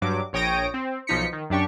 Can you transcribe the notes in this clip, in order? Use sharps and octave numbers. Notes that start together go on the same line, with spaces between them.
G2 F#3 D6
A#1 C#5 G5 D#6 A#6 D7
C4
B1 F3 D#4 B6 C#7
D#3
F#2 D4 G4 C#6